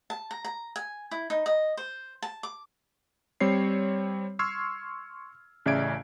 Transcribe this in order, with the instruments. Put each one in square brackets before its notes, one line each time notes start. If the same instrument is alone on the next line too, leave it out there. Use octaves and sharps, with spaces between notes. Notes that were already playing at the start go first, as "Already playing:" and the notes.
[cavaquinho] A5
A#5
A#5
G#5
E4
D#4
D#5
C5
A5
D6
[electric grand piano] G3 C4 C#5 C7
C6 C#6 E6 F6 G#6 C7
A1 C#3 D5 E5 G#6 D7